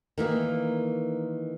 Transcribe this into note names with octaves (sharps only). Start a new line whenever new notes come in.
D#3 E3 A#3